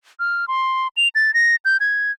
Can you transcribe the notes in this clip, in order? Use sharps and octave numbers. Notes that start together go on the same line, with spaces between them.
F6
C6
F7
A6
A#6
G6
G#6